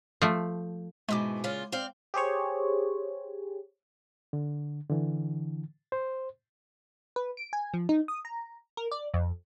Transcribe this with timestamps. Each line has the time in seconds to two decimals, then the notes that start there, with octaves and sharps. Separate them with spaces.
0.22 F3 A3
1.09 G#2 B2 E3 G#3 D6
1.44 A#2 C#3 F4
1.72 C4 D5 F5
2.14 G4 G#4 C5 C#5
4.33 D3
4.90 D3 E3
5.92 C5
7.16 B4
7.37 D7
7.53 G#5
7.74 F3
7.89 D#4
8.08 D#6
8.25 A#5
8.77 A#4
8.92 D5
9.14 F2